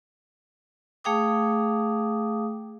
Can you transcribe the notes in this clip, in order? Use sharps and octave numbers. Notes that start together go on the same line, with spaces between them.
A3 G#4 F5 G5 D6 D#6